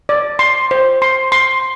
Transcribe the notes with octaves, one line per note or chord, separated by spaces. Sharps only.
D5
C6
C5
C6
C6